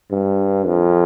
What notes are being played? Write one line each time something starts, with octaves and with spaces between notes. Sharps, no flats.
G2
F2